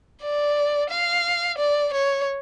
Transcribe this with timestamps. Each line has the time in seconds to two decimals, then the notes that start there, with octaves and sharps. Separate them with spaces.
0.22 D5
0.90 F5
1.58 D5
1.93 C#5